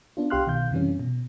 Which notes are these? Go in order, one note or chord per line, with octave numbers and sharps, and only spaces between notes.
B3 D4 F4
C2 G4 F5 C6 F6 F#6
B2 D#3 F5 G6
F#2 C3 E3 G3 C#4
B2